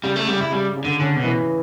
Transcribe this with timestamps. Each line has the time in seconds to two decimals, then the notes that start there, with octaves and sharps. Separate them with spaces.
0.03 C#3 G3
0.16 A3
0.28 C#3 G3
0.41 E4
0.52 C#3 G3
0.77 C#3
0.85 D3
1.00 D3 C#4
1.16 B2
1.24 E3